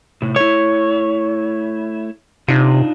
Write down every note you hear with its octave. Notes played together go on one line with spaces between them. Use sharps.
A2 C3
A3 E4 C#5
C3 D4 D#4 F4